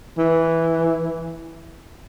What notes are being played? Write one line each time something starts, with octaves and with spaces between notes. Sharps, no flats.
E3